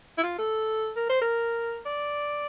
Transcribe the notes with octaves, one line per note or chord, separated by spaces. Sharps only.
E4
F4
A4
A#4
C5
A#4
D5